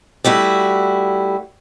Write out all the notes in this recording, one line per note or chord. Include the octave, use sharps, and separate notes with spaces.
G3 A3 E4 F#4